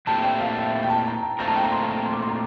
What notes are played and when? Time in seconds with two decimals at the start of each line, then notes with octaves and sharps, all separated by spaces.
0.07 A#2 A3 C4 E4 G4 A5
0.23 G5
0.40 F5
0.57 E5
0.83 G5
0.90 A5
1.07 A#5
1.22 A#5
1.39 A#2 A3 C4 F4 A#4 A#5
1.48 A5
1.56 G5
1.64 A#5
1.72 C6
1.89 A#5
2.06 C6
2.13 D6
2.22 C6
2.30 A#5